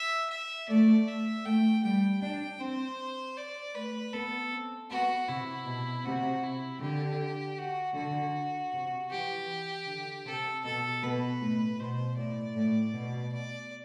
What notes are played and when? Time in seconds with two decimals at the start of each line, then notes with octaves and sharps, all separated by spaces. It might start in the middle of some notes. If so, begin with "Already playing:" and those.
Already playing: E5
0.30 E5
0.68 A3 D5
1.07 E5
1.45 A3 G5
1.83 G3 G5
2.22 D4 G5
2.60 C4 C5
3.37 D5
3.75 A3 B4
4.13 B3 A4
4.52 C4
4.90 B3 F#4
5.28 C3 E4
5.66 B2
6.05 C3 F#4
6.43 E4
6.81 D3 G4
7.58 F#4
7.96 D3 F#4
8.73 C3
9.11 E3 G4
9.87 D3
10.26 C3 A4
10.64 B2 A4
11.03 B2 B4
11.40 A2
11.79 B2 C5
12.17 A2 D5
12.56 A2
12.94 B2
13.33 D5